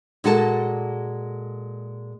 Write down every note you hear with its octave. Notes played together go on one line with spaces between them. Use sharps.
A#2 G#3 F#4 A4 G#5 A5